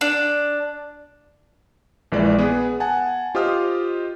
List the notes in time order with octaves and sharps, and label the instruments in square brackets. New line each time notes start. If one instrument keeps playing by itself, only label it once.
[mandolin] D4
[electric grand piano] A#1 E3 G#3 D5
B3 G#4 B4
F#5 G#5 A5
F4 G4 C5 D#5 D#6 F6